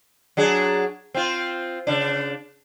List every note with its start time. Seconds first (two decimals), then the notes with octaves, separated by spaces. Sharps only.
0.37 F#3 D4 G#4
1.14 C4 F4
1.87 C#3 D4